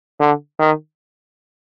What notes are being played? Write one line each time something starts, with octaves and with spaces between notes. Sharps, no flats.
D3
D#3